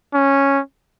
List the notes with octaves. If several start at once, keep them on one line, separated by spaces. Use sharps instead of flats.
C#4